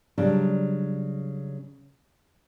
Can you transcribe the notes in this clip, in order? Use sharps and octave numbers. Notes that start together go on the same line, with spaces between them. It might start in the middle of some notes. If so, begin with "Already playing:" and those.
C#3 F#3 G3 D4